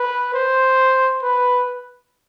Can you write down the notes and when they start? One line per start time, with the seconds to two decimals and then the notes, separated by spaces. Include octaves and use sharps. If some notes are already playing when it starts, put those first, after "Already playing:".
Already playing: B4
0.34 C5
1.23 B4